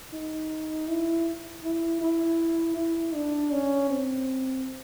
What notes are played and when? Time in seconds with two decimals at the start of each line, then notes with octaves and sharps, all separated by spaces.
0.13 D#4
0.89 E4
1.64 E4
2.01 E4
2.76 E4
3.14 D4
3.52 C#4
3.90 C4